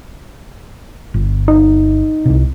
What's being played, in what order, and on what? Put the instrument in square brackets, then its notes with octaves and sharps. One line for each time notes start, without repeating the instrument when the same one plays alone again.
[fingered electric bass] G1
[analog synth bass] D#4
[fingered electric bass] C2 C3